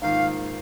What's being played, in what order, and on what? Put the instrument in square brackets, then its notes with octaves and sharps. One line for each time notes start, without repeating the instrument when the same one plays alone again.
[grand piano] G#2 D#3 A#3 F4 [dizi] F5